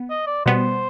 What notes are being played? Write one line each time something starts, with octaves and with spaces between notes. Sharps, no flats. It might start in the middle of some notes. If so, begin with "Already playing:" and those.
Already playing: B3
D#5
D5
B2 G3 B3 C5